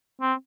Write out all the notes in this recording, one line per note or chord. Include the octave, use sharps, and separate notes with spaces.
C4